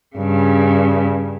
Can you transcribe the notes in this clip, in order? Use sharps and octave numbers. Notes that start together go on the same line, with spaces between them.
G2 C#3